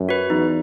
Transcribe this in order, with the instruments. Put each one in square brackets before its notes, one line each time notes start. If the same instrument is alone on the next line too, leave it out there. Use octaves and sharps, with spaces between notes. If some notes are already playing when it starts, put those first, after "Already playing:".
Already playing: [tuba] F#2
[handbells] F#4 B4
[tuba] E2 [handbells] D#4